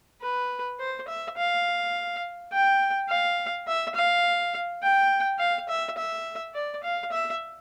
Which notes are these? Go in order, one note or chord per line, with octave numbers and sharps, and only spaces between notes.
B4
C5
E5
F5
G5
F5
E5
F5
G5
F5
E5
E5
D5
F5
E5